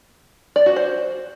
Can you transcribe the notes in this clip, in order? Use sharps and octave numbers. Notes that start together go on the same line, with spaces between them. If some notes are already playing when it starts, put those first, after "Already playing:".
D5
F#4
C5